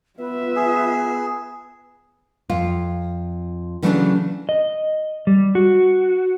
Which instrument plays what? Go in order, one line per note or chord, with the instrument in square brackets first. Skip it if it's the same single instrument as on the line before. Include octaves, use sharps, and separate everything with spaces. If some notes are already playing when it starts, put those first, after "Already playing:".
[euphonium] B3 [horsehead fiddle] F4 E5 [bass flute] B4
[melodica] G#4
[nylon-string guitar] F2 F4
C#3 E3 F#3 A3 C4 D4
[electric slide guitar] D#5
G3
F#4